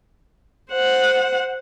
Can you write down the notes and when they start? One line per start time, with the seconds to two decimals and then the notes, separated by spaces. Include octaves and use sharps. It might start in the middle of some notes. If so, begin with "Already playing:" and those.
0.71 C5 F#5